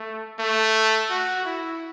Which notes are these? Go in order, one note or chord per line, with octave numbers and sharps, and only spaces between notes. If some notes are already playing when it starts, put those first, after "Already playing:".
Already playing: A3
A3
F#4
E4